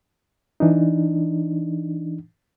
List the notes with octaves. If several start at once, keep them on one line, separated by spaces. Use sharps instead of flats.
E3 D4 D#4